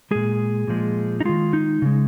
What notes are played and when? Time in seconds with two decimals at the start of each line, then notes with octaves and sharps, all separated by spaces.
0.11 A#2 G#3 G#4
0.68 A#2 F3 G#3
1.20 D#4
1.25 D#3 G#3 F4
1.53 D#4
1.82 C#3 G#3